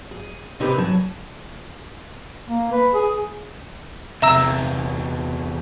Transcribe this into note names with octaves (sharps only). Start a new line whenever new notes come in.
G#4
C3 C4 D#4 G4 A#4 B4
F#3 G#5 A5
A#3
B4
G#4
E2 C3 E5 A#5 E6